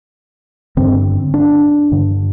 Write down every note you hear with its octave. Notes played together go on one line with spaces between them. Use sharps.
G2 D3 C4
D4
G2 D3